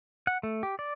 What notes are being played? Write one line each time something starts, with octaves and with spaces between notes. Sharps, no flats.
F#5
A3
G4
D5